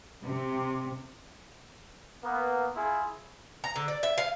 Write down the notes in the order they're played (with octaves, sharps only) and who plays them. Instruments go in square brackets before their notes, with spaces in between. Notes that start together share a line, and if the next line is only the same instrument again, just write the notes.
[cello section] C3
[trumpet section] A#3 B3
E4 F4 G#4
[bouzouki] A#5
D3
D5
E5
F5